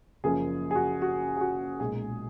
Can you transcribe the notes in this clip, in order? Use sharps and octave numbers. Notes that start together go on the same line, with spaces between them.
F#1 F#2 F3 A#3 G#4
G#4
F#4
F#4
G#4
F#4
B1 A#2 G#3 G#4